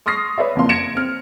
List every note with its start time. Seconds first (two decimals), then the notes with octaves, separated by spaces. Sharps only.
0.06 C6 C#6 D#6 F6 A#6 C7
0.38 B4 C#5 D5 E5
0.56 F#1 F2 E3 A#3 F5 C6
0.69 G#6 A#6 C#7 D7 E7
0.95 C4 F6